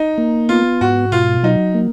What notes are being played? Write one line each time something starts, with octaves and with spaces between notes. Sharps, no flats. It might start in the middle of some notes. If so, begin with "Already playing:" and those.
Already playing: D#4
A#3
B3 F4
G#2 F#4
B2 F4
F#3 D#4
A#3